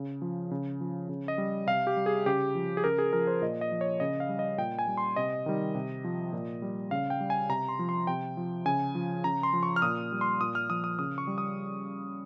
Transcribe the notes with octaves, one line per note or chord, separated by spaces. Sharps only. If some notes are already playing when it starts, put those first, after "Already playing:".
Already playing: C#3
F3
C#3
F3
C#3
D#5
G3
C3 F5
G4
G3
G#4
C#3 G4
F3
G#4
C#3 A#4
G#4
F3 A#4
C5
A#2 D#5
D#5
F3
C#5
C#3 D#5
F5
G3
D#5
A#2 G5
G#5
G3
C6
C3 D#5
D#3 G3
C3
F3
A#2
G3
C#3 F5
G5
G3
G#5
C3 A#5
C6
F3
C6
C3 G5
F3
C#3 G#5
F3
C#3 A#5
C6
F3
C#6
F6
A#2 D#6
G3
C6
A#2 D#6
F6
F3 D#6
D#6
C#3 D#6
C#6
G3
D#6